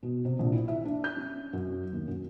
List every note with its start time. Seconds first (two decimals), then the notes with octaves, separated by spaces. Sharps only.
0.03 B2
0.25 C3
0.39 A#1
0.52 E4
0.68 E5
0.85 D4
1.04 G6
1.17 C#4
1.53 F#2
1.92 D#2
2.08 F#2